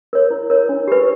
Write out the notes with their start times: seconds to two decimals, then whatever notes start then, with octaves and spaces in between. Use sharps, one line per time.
0.13 A#4 C#5
0.31 E4
0.50 A#4 C#5
0.69 D4
0.88 G4 B4